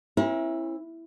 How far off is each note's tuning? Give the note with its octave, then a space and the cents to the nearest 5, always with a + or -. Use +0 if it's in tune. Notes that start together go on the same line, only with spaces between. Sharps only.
C#4 -45 E4 +0 A#4 +40